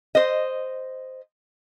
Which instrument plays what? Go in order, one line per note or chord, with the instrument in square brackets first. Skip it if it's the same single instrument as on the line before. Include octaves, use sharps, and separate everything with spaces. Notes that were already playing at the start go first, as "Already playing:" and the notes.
[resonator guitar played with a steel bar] C5 D#5